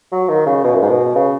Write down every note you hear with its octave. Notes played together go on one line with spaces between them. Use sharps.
F#3
D#3
C#3
B2
F#2
G#2
B2
C#3